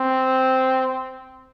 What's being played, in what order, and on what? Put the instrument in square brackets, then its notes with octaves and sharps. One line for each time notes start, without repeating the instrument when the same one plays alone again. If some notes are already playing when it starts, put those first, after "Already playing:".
Already playing: [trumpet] C4